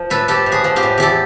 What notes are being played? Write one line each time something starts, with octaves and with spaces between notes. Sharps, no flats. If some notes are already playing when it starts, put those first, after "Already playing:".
Already playing: F3
A2 A4 B4
F3 G4 A4
A2
F#4 G#4
F3
F4 G4
A2
E2 G4 A4